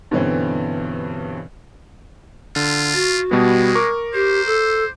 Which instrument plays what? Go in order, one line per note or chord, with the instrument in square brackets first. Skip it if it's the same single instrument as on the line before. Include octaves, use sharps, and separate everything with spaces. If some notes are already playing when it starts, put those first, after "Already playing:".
[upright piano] G2 B2 D3 E3 C4 C#4
[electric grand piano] D3 [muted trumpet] F4
[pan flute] F#4 [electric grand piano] A6
[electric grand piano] B2 G3 B3 [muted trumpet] G#3
[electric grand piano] A#4 C#6 D6
[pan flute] G4 [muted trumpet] C5
[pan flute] A4